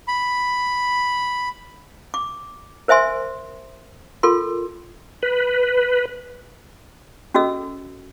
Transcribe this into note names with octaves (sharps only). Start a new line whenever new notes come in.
B5
D6
A#4 C5 E5 G#5 C6
F4 A4 A#4 C6
B4
C#4 F#4 A4 D#5 E6